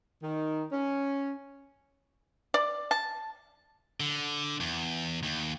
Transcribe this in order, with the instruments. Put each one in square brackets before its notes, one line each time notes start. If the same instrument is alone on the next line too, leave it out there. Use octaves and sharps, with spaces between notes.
[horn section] D#3
C#4
[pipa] D5
A5
[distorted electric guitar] D3
E2
D#2